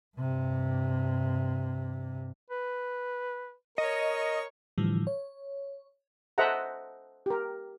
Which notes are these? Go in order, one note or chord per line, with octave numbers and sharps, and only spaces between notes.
G2 C3
B4
A#4 C#5 D#5 C#6
A2 D3 E3 F3 G3
C#5
A4 C5 D#5 E5 F#5 A#5
G4 A#4